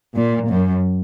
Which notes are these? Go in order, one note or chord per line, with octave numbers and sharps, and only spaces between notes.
A#2
F#2